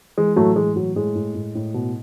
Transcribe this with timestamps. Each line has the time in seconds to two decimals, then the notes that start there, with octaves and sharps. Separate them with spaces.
0.18 E3 G#3
0.36 A2 F#3 A3
0.56 E3 G#3
0.75 A2 F#3
0.96 A2 G#3
1.15 A2
1.35 A2
1.55 A2
1.74 B2